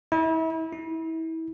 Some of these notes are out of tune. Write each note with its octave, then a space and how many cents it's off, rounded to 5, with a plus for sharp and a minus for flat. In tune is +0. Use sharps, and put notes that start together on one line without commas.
E4 -35
E4 -30